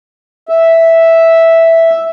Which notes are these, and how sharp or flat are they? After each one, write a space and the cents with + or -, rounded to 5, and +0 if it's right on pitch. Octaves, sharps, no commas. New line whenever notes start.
E5 -5